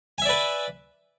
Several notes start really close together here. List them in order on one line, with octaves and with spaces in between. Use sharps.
G#5 E5 D5 B4